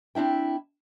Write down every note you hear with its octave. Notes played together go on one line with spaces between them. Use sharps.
C4 D4 E4 G5